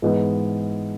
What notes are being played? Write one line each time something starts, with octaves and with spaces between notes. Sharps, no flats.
G#2 E3 G#3 B3